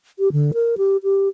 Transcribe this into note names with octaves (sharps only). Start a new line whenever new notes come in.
G4
D3
A#4
G4
G4